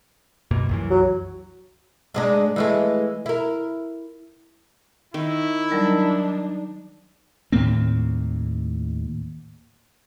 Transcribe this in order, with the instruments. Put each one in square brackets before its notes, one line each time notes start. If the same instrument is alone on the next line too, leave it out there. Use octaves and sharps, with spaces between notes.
[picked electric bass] F#2 B2 A#3
C2 F#2 E3
[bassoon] F#3
[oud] G#2 G#3 D4
E3 G#3 A3
E4 A#4
[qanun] D#3 [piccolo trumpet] E4
[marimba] F#3 G3 A#4 [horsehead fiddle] D4 D#4
[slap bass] D#2 A2 A#3 C4